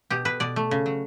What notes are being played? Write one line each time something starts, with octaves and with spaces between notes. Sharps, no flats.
B2 G4
B2 B4
B2 D5
A3
C#3
F#3